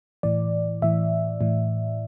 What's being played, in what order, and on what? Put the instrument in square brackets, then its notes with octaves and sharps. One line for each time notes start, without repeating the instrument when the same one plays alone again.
[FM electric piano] A2 E3 D5
A2 E3 E5
A2 E3